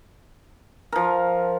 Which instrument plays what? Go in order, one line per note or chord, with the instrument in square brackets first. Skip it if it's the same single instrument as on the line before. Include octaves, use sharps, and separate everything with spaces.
[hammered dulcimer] F3 A#4